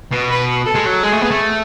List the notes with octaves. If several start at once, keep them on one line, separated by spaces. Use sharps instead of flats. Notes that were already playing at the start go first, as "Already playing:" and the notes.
B2
B4
A4
G#3
F#3
G#3 G#4
A3
B3
A3